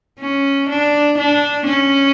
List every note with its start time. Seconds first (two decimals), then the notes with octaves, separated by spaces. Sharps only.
0.20 C#4
0.70 D4
1.18 D4
1.66 C#4